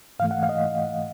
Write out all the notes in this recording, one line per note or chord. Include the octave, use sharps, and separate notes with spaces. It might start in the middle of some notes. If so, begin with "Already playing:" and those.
G#2 E3 A3 F5
F#5
F5
D#5